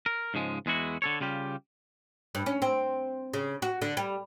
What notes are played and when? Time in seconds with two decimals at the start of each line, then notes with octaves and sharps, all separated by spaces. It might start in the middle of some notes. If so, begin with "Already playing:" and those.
0.06 A#4
0.34 G#2 C#3 F3 G#3
0.66 E2 G#3 E4 F#4
1.02 D3 A4 C#5
1.21 C#3 G3 F4 G4
2.35 G2
2.46 C#4
2.62 C4
3.34 C#3
3.62 F#4
3.82 D3
3.97 G3